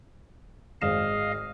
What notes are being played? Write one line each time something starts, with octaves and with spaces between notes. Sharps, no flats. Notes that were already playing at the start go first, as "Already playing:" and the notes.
G#1 G#4 D#5 F5 E7